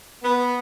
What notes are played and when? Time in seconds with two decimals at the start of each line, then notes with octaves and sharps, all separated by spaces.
0.22 B3